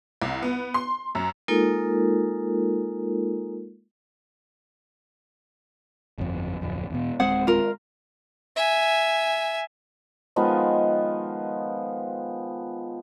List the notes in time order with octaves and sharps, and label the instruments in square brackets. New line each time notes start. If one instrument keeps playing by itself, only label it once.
[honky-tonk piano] C2
B3
C6
F#2
[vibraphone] G#3 A#3 D#4 F4 A4 A#4
[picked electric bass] G1 F2
D1 F2
E2 B2
[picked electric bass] D1 G#3 C4 [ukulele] G#4 C5 F#5
[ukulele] F4 A#4
[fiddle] E5 G#5
[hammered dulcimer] D#3 F3 G#3 B3